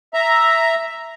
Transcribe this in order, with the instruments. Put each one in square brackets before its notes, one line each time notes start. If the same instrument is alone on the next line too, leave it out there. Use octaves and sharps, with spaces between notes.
[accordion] E5 A#5